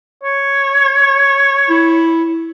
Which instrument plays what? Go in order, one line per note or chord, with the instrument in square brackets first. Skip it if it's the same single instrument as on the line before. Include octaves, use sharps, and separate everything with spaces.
[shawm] C#5
[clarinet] E4